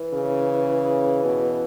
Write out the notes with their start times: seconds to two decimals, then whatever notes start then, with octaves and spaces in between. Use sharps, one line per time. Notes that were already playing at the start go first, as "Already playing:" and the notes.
Already playing: E3
0.13 C#3
1.24 B2